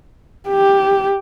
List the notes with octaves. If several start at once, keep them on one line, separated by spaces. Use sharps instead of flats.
G4